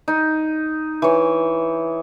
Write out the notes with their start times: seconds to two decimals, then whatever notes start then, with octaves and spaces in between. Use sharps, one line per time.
0.08 D#4
1.02 E3 C#5